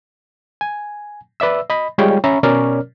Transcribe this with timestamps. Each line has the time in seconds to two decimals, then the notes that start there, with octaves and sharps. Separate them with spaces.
0.61 G#5
1.40 B4 D5 E5 E6
1.70 D#5 B5
1.98 G3 G#3 F4 C#5 G5
2.24 C#4 E5 A#5 B5 C#6
2.43 B2 C#4 A#4 C#5 D5 F6